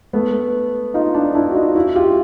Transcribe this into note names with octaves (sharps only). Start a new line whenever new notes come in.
A3 B3
D#4 F4
D4 E4
D4 E4
F#4
D#4 F4
E4 F#4
F4 G4